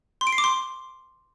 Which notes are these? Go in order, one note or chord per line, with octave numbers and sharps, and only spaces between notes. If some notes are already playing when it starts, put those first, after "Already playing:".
C6
D7
C7
D6
C6